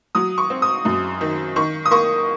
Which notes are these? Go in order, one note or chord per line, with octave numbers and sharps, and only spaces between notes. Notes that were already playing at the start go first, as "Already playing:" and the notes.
F#3 D#6
C#6
C4
D#6
F#2
D#3
D#3 C#6
D#6
A#3 C#6